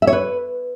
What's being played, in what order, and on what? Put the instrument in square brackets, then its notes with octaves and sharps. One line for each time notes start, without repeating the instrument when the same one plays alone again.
[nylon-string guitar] E5
C#5
B4